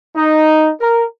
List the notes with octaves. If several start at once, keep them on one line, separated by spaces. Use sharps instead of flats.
D#4
A#4